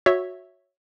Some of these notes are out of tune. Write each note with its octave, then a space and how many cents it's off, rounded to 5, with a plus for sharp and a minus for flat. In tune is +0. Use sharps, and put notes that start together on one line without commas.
F#4 -15 C#5 +0 E5 +0